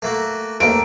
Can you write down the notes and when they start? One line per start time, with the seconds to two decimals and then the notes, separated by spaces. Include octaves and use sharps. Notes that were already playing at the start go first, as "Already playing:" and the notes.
0.02 A3 A#3 F#4
0.60 D#2 A3 A#3 D7